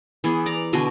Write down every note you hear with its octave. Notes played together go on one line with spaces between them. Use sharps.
E3 B3 G#4
D5 A#5
B2 D3 F#4 G#5